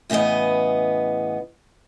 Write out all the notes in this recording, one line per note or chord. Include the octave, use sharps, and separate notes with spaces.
A2 C#3 E3 B3 D#5